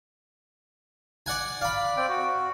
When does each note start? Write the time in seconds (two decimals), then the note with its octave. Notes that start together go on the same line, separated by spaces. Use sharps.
1.26 D5 F#5 G#5
1.61 D5 F5 B5
1.97 C4 D5 G5
2.09 F#4